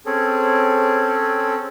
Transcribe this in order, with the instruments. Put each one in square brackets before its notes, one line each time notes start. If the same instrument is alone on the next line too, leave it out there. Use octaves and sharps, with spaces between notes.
[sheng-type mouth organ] C4 C#4 G#4 A4